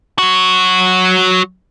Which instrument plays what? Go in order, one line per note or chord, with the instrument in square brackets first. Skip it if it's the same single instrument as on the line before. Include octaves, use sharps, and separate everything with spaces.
[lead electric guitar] F#3 F#4